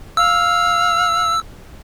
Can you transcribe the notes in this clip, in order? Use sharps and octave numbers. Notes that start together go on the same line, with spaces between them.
F5 E6